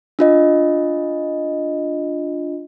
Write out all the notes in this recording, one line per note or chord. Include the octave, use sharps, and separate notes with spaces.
D4 F4 D#5